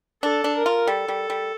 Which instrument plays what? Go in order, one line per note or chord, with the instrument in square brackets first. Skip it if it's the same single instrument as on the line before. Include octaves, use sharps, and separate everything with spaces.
[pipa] D4 [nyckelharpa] A4
[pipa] D4
[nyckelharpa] A#4
[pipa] F4
[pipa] G3 [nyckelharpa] A4
[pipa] G3
G3